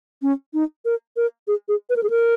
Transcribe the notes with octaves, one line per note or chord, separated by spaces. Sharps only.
C#4
D#4
A#4
A#4
G#4
G#4
B4
A#4
G#4
A#4